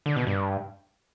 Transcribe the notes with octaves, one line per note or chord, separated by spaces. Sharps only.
D3
B2
G2